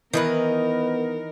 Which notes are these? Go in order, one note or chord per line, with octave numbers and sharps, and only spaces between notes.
D#3 E3 B3 D#4 A#4 B4